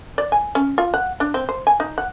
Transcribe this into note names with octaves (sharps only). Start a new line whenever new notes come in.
D5
G#5
C#4
F4
F#5
D4
C4
C5
G#5
D#4
F#5